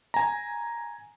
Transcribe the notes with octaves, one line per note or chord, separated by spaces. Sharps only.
G#5 A#5